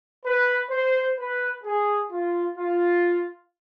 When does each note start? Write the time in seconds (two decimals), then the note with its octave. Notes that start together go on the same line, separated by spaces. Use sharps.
0.24 B4
0.70 C5
1.18 B4
1.64 G#4
2.10 F4
2.58 F4